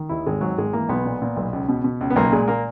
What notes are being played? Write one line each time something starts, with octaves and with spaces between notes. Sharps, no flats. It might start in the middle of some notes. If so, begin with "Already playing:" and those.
Already playing: D#3
D#2 E4
G#1 G#3
G#2 F#3
G#1 G#3
E3 A#3
B1 B3
A#2
A#2
B1
C#2
B2
B2
C#2
B3
B1 A#3
A#2 G#3
A#2 A#3